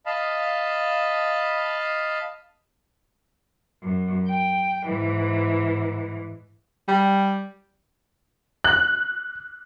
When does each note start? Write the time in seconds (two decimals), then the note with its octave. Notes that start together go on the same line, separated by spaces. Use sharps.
0.06 D#5 F5 A5 B5
3.82 F#2
4.27 G5
4.85 G#2 E3
6.88 G3
8.64 F#6